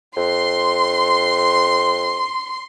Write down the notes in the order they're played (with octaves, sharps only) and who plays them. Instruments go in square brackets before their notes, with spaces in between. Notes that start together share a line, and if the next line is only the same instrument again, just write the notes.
[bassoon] F2 [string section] C6